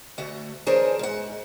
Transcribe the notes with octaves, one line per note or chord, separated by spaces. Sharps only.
D2 A3 F#4
E3 D4 G#4 A#4 C5 C#5
G#2 F#5